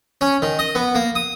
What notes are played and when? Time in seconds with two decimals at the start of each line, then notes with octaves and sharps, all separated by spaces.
0.21 C#4
0.42 D#3
0.59 D#5
0.75 B3
0.95 A#3
1.15 D#6